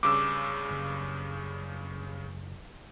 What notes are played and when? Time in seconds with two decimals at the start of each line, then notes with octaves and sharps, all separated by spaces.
0.03 G2 C#3 D6 E6
0.70 F#1